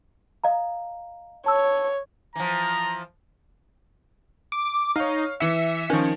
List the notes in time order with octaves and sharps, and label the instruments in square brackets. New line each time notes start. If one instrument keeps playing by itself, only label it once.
[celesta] D#5 F5 A#5
[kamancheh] C#5 [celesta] A5 E6
[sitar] E3 F3 [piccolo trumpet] A#5
[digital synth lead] D6
[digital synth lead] D#4 [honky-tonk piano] C#5 F5
[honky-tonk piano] E3 C#7 [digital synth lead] E5
[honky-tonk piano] D#3 F3 [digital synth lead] C#4